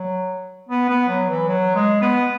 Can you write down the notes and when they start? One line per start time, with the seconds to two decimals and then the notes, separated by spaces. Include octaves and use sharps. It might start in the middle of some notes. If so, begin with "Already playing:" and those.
Already playing: F#3
0.69 B3
0.89 B3
1.09 F#3
1.29 E3
1.48 F#3
1.75 G#3
2.02 B3